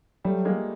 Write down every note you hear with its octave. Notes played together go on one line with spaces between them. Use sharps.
F#3 G3 A3
G#3 A#3